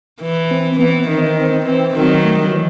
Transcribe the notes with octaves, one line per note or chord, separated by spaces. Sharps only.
E3
C4
E3 B3
C4
B3
D#3 D#4
C4
D#4
C4
C4
E3
D#3 F#3
A3
G3
E3